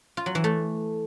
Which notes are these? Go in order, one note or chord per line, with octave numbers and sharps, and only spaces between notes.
F4
F#3
E3
A3